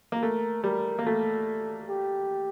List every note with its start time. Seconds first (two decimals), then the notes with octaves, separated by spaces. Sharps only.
0.12 A#3
0.23 A3 A#4
0.64 G3 A#4
0.99 A#3
1.06 A3 A4
1.89 G4